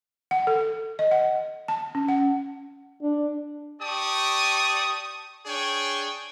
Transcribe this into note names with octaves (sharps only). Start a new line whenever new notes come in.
F#5
A4
D#5
F#5
A5
C#4
F#5
D4
G4 D5 A5 C#6 D#6
D4 G#4 C#5 G5 G#5 C#6